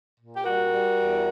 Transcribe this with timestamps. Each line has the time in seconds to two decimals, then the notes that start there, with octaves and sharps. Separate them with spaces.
0.19 A#2
0.36 G4
0.44 G3 F#4 A#4
0.71 G3
0.98 E2